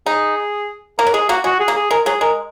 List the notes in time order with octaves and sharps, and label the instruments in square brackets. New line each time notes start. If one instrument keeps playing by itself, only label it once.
[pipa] D#4 [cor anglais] G#4
[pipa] A#3 [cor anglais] A#4
[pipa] F#3
[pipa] G#3 [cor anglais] G#4
[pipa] A#3 [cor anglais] F#4
[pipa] G#3 [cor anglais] F#4
[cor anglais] G#4
[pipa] A#3
[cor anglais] G#4
[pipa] G#3 [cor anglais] A#4
[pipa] F#3 [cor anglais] G#4
[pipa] G#3 [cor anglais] A#4